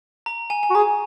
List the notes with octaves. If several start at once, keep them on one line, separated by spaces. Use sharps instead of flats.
A#5
G#5
G#5
F#4
G#4 A#5